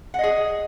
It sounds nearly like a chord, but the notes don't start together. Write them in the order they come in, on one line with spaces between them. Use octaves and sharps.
F#5 D#5 G#4